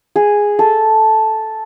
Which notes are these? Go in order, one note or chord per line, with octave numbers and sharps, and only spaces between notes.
G#4
A4